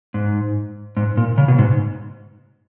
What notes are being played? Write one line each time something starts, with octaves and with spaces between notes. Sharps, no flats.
G#2
G#2
A#2
C#3
B2
G#2